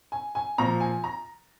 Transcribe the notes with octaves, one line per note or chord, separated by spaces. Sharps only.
G#5
G#5
A#2 F3 A#5
G#5
A#5